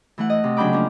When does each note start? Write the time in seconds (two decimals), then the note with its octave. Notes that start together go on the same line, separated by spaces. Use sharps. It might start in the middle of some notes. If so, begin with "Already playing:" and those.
0.18 E3 A3 F#5
0.30 D#5
0.44 C3
0.57 C#3 F#3 D4 G5 B5 D6
0.73 F3 A#3 D4